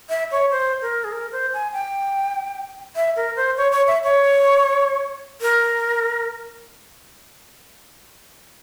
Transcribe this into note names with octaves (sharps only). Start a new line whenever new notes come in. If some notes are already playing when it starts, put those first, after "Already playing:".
E5
C#5
C5
A#4
G#4
A#4
C5
G#5
G5
E5
A#4
C5
C#5
C#5
E5
C#5
A#4